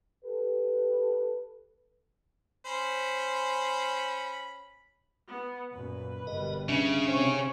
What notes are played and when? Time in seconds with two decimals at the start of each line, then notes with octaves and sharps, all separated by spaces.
0.24 G4 A4 B4
2.65 C#4 C5 B5
5.28 B3
5.74 F#2 A#2 B4
6.27 G1 B2 G3 A#4 D#5
6.69 C#3 C#4 D4 E5
7.06 C3 C4 C#5